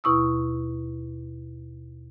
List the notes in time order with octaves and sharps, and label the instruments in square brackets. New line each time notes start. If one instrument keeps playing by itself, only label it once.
[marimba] D#2 B2 E4 C#6 D#6 E6